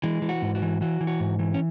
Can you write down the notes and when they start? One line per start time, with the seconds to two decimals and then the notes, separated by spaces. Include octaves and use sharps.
0.03 E3 G#3
0.22 E3
0.29 F#4
0.42 G#2
0.55 F#4
0.62 E3
0.81 E3 F#4
1.01 E3
1.07 F#4
1.20 G#2
1.39 E3
1.54 C#4